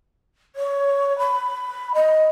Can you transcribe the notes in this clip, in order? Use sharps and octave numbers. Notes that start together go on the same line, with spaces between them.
C#5
B5
D#5